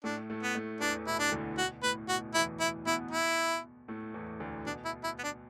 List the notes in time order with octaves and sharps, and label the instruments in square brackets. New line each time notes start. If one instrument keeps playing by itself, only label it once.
[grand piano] A2 A3 [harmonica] D4
[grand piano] A2 A3
[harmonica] B3
[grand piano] A2 A3
[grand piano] E2 E3 [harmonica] D4
[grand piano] B2 [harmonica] E4
[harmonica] D4
[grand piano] D2 D3
[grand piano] B2 [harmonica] F#4
[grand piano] A2 [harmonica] B4
[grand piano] B2 [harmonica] F#4
[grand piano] E2 E3 [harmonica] E4
[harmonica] E4
[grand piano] B2 B3 [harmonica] E4
[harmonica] E4
[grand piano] A2 A3
E2 E3
D2 D3
[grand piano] B2 [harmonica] D4
[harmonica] E4
E4
B3
D4